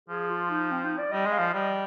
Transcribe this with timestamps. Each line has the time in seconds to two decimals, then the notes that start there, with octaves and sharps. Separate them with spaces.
0.09 F3 G#4
0.30 F4
0.50 D#4
0.71 C4
0.85 D#4
0.98 D5
1.12 G3 D#5
1.26 G#3
1.32 F5
1.39 F3
1.53 G3 D#5